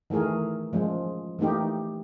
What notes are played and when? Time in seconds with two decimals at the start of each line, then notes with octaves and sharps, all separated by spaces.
0.10 D#3 E3 A3 G#4 A#4
0.73 F3 G#3 C#4
1.39 E3 A3 A#3 D#4 G4